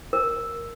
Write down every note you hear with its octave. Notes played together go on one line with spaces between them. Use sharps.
A#4